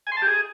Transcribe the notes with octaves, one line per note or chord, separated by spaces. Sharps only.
G#5
C6
A5
G4
G#4